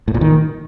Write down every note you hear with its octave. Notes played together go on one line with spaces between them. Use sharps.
A2
A#2
D#3